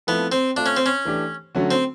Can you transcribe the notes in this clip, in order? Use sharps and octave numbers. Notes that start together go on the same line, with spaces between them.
F3 A3 B3 C4 E4 A4
C4
A3 C4 D4 F4
C#4
C4
C#4
E3 A3 D4 G4
D3 F#3 A3 C#4 F#4
C4